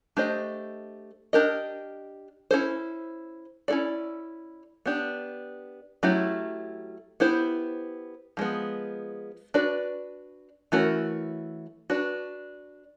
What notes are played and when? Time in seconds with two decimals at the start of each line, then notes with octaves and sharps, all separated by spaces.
0.17 A3 D4 G4 C5 D#5
1.33 D4 G4 A#4 D#5
2.51 C#4 E4 A4 C5
3.68 C#4 E4 A4 D5
4.86 B3 D4 G4
6.03 F#3 A3 C#4 E4 G4
7.20 B3 E4 G4 C5
8.37 F3 G#3 B3
9.54 D4 F#4 B4 D5
10.72 E3 A3 C#4 F#4 A#4
11.90 D4 F#4 B4